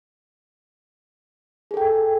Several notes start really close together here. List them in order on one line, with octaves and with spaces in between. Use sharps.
G#4 A4 G5